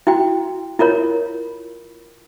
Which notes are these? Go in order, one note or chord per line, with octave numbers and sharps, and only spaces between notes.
E4 F#4 G5
E4 F4 A#4 C#5